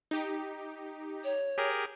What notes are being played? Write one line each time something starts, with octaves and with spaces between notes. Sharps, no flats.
D#4 G4
C#5
G4 G#4 A#4